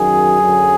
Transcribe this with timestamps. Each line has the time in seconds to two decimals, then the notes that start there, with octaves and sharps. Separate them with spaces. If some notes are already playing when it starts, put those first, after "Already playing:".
Already playing: F#2 D#3 F#3 G#4
0.40 F#2 D3 F#3